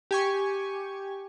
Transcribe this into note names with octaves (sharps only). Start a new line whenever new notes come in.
G4 G#5 C#6